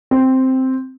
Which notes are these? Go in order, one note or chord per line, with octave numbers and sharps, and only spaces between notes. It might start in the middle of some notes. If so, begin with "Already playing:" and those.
C4